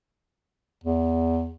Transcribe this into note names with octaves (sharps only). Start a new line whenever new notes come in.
E2